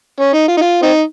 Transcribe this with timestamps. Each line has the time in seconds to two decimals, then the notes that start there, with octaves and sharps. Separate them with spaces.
0.20 C#4
0.33 D#4
0.48 F4
0.57 D#4
0.61 F4
0.82 C4 D#4